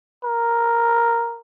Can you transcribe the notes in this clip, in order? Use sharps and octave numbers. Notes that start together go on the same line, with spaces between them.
A#4